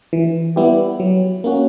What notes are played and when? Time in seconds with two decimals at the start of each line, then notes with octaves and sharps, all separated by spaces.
0.13 E3
0.56 G3 B3 E4 G4
1.00 F#3
1.44 A#3 C#4 F#4